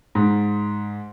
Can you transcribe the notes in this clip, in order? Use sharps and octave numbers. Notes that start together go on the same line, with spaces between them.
G#2